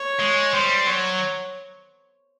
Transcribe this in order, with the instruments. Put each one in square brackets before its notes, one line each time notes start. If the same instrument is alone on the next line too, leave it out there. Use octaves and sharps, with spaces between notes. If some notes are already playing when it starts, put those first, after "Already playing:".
Already playing: [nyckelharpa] C#5
[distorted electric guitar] G#3
[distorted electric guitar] G3 [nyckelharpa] C5
[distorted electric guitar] F#3 [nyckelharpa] C#5